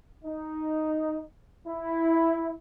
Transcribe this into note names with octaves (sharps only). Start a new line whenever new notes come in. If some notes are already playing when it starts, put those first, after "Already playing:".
D#4
E4